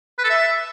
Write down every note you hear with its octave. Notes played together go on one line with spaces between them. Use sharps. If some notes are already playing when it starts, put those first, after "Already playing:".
B4
A4
E5